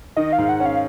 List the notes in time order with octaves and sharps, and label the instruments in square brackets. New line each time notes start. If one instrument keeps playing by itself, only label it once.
[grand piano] D#3 [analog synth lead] D#5
[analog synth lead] F5
[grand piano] G#2
[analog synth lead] F#5
[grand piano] C#4
[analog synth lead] F5